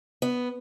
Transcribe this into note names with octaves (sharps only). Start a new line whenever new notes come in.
B3